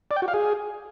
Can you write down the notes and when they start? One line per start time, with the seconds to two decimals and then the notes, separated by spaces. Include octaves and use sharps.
0.11 D5
0.16 G5
0.22 F#4
0.28 F5
0.34 G#4